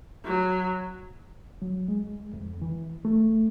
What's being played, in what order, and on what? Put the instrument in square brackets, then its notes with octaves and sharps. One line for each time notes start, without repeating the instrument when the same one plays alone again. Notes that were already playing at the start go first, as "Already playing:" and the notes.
[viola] F#3
[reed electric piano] F#3
G#3
F2
E3
A3